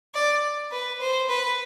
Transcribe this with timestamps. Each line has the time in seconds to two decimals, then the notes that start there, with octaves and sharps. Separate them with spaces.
0.14 D5
0.72 B4
1.00 C5
1.29 B4